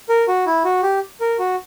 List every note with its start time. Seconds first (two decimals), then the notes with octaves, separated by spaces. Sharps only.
0.09 A#4
0.28 F#4
0.46 E4
0.64 F#4
0.83 G4
1.21 A#4
1.39 F#4